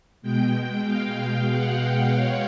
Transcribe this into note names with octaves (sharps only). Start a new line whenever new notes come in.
B2 G#3 G5
G5
F5
F5
F#5
F5
C#5